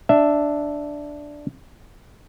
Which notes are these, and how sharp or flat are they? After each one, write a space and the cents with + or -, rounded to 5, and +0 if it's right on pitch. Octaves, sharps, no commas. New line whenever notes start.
D4 +0 E5 +0